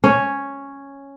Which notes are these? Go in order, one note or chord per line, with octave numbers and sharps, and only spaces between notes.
C#4